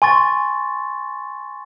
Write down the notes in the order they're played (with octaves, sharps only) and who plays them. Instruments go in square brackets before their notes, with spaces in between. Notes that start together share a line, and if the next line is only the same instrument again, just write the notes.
[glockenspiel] G#5 C6 C#6 A6